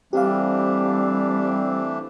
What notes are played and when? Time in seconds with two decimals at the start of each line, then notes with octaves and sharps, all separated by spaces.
0.13 E3 G3 A3 C4 D4 G4 F5